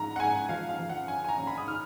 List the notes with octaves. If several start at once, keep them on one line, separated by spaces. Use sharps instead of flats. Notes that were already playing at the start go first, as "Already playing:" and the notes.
Already playing: G#2 F3 A#5
F#5
G#2 G#5
F3 F5
F5
F3
F#5
F#2 G#5
G#5
A#5
F#2
B5
D#6
D#3 F6